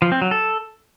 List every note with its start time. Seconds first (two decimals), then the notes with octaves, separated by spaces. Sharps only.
0.02 F3
0.12 C4
0.22 F#3
0.31 A4